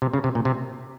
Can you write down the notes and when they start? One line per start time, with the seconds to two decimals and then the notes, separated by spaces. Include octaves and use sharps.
0.02 C3
0.13 C#3
0.24 C3
0.35 A#2
0.45 C3